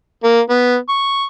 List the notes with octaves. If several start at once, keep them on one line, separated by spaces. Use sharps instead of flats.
A#3
B3
C#6